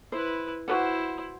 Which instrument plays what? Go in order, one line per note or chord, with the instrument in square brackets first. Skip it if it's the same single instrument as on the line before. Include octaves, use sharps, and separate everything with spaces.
[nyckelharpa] E4 B4 [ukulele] C5
[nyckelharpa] E4 C5 [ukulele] F#4 B4 F#5